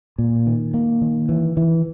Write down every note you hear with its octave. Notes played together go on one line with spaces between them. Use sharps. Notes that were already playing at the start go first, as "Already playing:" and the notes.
A#2
D#3
A#3
D#3
E3
E3